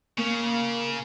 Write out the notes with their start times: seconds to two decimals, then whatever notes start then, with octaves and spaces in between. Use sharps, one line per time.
0.18 C#3 A#3